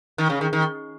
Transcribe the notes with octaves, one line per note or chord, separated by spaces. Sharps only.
D#3
C#3
D#3
D#3